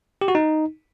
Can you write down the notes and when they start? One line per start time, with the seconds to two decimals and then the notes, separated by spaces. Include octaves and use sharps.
0.21 G4
0.28 F#4
0.35 D#4